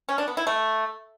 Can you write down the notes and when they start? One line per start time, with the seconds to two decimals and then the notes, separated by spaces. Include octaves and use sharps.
0.09 C#4
0.18 D4
0.28 B3
0.37 E4
0.47 A3